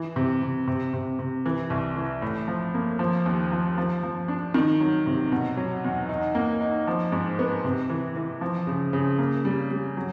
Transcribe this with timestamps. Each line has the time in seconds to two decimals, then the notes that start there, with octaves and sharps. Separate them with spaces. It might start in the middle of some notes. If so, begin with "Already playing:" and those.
Already playing: E3
0.16 C3
0.42 C3
0.68 C3
0.93 C3
1.19 C3
1.46 E3
1.70 C2
1.96 E3
2.22 A2
2.48 F3
2.74 A#3
2.99 F3
3.26 D#2
3.52 F3
3.78 F3
4.03 F3
4.28 D4
4.54 D#3
4.80 F#3
5.06 C3
5.32 B2
5.57 F#3
5.84 E2
6.09 D#4
6.35 A#3
6.61 D#4
6.87 F3
7.12 G#2
7.39 B3
7.64 C3
7.90 E3
8.16 E3
8.41 F3
8.67 C#3
8.93 C#3
9.18 A#3
9.45 G3
9.71 G3
9.97 F#3